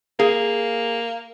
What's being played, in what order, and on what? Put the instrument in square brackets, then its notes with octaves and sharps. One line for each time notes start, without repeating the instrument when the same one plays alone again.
[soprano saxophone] A#3 [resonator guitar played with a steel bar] G#4